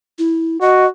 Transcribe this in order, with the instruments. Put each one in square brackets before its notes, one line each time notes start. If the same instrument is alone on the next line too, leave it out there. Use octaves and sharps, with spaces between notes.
[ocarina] E4
[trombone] F#4 [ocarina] D#5